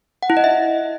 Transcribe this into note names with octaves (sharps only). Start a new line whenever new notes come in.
F#5
E4
D#5
E5